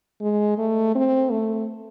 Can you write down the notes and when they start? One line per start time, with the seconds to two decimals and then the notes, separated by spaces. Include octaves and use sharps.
0.21 G#3
0.58 A3
0.95 C4
1.31 A3